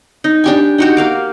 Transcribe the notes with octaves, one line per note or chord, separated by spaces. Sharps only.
D#4
D4 G4 G#5
D#4 F#4 G4
A#3 F5 D6